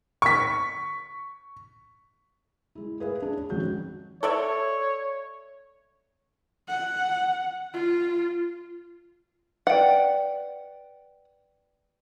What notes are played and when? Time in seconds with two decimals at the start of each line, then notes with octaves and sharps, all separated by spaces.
0.22 C#6 B6
2.75 G#3 E4
3.00 G#4 B4 E5 F5
3.22 D4 G#4
3.37 C#5
3.50 G#1 F2 C#4 F#4 G6
4.23 A4 C#5 D5 E5
6.68 F#5
7.73 F4
9.67 B4 D5 F#5 G5